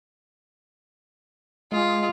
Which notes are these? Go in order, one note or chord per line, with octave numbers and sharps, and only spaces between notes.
G#3 F4